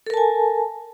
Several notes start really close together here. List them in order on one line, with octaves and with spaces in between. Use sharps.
A4 A#4 A5 G#5